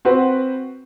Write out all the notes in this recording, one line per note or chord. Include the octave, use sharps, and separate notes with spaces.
C4 F#4 B4